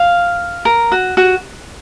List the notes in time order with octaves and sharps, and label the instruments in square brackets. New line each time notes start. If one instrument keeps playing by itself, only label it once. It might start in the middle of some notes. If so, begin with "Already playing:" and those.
Already playing: [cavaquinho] F5
A#4
F#4
F#4